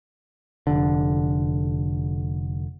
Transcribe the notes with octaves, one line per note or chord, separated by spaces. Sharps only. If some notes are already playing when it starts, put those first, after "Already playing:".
F1 D3